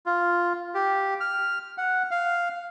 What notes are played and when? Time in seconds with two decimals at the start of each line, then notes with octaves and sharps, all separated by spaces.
0.06 F4
0.75 G4
1.20 F6
1.78 F#5
2.11 F5